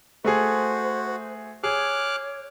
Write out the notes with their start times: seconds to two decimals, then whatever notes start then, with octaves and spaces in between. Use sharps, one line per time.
0.24 A3 F#4 G#4 C5
1.63 G#4 C#5 D6 F6 F#6